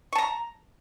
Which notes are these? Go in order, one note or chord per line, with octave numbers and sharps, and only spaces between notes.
A5 A#5 C#6